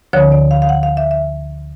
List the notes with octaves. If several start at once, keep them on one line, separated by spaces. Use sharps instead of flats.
D2 D3 F3 C#5
D5
F5
F5
F#5
F5
E5
E5